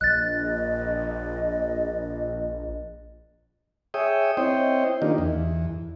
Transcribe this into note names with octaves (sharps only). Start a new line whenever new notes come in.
A#1 D#5 F#6 A6
G#4 C#5 E5 G5 D#6
C4 E4 C5 C#5 D#5 G5
D#3 A#3 D4 D#4 F4 G4
E2